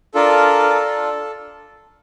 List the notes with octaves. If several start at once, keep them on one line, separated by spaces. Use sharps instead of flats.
D4 F4 A4 A#4
A4